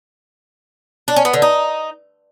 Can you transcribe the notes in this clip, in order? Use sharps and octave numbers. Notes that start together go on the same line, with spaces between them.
D4
C#4
B3
D3
D#4